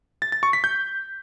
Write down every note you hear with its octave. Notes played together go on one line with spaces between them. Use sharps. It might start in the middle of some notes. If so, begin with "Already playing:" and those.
A6
A6
C#6
B6
G6